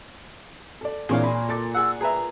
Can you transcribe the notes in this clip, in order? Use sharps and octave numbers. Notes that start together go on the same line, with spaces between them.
A4 D5
A#2 E3 C4 D4 G#4 C#5 F5
B5
A4 D6 A6
G#4 F#5 E6
G#4 B4 E5 A#5